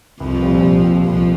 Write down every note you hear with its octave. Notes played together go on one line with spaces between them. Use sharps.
C2 F2 F3
A#2 G3 C4 F4
C2
A#2 G3 C4 F4
C2 F2 F3